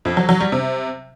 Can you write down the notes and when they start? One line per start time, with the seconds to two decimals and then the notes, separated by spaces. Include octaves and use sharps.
0.05 F2
0.17 F#3
0.29 F#3
0.40 G3
0.52 C3